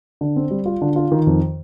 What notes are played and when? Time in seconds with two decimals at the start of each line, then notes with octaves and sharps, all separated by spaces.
0.21 D3
0.36 C4
0.51 G3
0.66 F4
0.81 D3
0.96 F4
1.12 D#3
1.27 F2